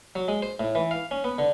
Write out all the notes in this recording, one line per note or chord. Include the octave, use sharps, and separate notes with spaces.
F#3
G#3
C5
A2
E3
F5
C#4
B3
D3